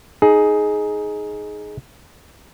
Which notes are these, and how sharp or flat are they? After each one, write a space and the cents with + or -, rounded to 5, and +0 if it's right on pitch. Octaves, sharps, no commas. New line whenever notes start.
D#4 +0 G#4 +15